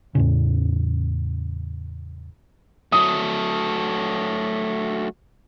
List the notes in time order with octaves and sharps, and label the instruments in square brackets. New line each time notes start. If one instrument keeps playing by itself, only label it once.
[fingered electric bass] E2 A2 C#3
[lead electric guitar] F#3 A3 [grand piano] D#6